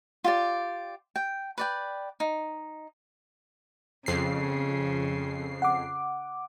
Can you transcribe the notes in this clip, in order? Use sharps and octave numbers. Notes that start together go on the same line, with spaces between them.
F4 G4 D5
G5
B4 D5 G5
D#4
F2 C#3 C7
F#5 D6